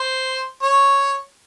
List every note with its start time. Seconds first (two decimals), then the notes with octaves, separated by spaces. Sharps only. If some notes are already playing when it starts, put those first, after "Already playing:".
Already playing: C5
0.63 C#5